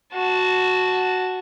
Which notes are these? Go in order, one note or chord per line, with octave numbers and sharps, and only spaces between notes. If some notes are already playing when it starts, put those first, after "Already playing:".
F#4 A5